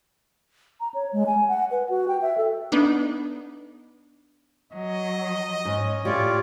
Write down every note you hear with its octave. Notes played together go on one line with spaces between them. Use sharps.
A#5
C#5
G#3
G#5
F#5
B4
F#4
G5
E5
A4
B3 D4 D#4
F#3 D#5
G#2 C#4
A2 F4 G4 C#5 D5